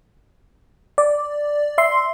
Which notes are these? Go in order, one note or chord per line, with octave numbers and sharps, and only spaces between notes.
D5
E5 C6